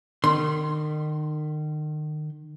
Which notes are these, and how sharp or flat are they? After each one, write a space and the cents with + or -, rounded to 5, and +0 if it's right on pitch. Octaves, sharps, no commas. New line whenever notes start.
D#3 -35 C6 +0